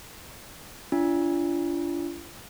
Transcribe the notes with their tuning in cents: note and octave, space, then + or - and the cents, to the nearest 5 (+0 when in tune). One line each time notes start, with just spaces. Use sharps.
D4 -30 F4 -40